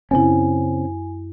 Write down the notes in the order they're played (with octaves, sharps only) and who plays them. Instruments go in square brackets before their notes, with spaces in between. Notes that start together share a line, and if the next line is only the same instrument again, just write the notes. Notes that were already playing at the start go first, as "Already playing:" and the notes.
[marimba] F#2 E4 [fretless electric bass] C#3 C4 C#4 [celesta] G#5